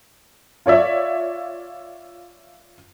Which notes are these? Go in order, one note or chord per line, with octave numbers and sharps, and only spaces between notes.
F4 C#5 D5 E5